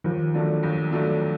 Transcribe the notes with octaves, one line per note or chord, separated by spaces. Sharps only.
D#2 D#3 F3
D3 F#3 A3 D4
D#2
D3 F#3 A3 D4